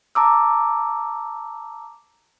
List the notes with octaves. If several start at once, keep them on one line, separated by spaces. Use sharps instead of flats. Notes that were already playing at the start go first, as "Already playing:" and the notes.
A5 A#5 D6 E6